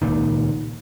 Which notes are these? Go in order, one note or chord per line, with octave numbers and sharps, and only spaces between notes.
D#1 C#2 A#2 D#3